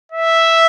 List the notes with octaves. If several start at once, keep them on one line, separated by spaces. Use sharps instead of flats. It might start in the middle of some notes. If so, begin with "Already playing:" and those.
E5